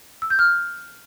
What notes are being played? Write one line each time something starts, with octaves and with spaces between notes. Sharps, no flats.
E6
G6
F6